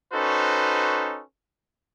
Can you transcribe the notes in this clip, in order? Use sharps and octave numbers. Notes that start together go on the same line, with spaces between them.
C#4 D#4 F#4 A4 B4 C5